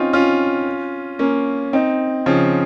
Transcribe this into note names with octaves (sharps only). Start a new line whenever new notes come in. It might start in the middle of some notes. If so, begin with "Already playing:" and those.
Already playing: C4 C#4 D#4 F4
C#4 F4
A#3 C#4
C4 D#4
C#3 F3